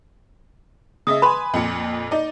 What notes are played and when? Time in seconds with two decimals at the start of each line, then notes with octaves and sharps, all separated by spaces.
1.07 C#3 D#5 E5 D#6
1.22 B4 G#5 B5 C6
1.54 F2 A#2 C#7
2.11 D#4 D5